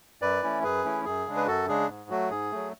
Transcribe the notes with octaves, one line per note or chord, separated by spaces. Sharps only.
F#2 B4 D5
E3 A3 C#4 E4
F#2 G#4 B4
E3 A3 C#4 E4
F#2 G#4
C#3 G#3 D4
B4
F#2 F#4 A4
C#3 G#3 D4 G#4
G#2
F#3 A3 F#4
G#2 G#4
F#3 A3